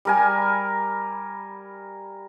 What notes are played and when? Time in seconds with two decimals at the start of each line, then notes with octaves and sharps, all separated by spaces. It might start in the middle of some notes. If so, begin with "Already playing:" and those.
0.05 G3 A#4 G#5